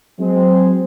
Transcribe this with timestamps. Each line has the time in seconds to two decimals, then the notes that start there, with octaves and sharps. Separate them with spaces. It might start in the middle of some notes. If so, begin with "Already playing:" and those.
0.20 F#3 G#3 C4